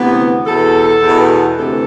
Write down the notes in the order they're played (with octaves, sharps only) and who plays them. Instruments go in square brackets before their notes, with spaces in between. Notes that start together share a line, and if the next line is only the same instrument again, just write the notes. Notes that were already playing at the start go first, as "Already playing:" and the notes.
Already playing: [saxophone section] D2 C3 E3 B3
E2 B2 A4
E2 B2
D2 C3 E3 A4